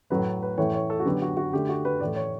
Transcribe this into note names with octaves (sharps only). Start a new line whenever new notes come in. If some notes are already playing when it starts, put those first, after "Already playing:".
A2 F#3 A3 B4
B4
A2 E3 A3 C#5
C#5
A4
F#4
D3 F#3 B3 G4
F#4
F#4
D3 A3 G4
F#4
B4
A2 E3 A3 D5
C#5